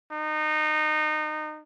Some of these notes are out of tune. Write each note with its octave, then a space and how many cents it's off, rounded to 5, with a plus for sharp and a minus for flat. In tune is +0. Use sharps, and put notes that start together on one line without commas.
D#4 -25